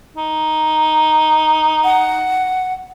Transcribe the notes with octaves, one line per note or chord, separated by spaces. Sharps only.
D#4
F#5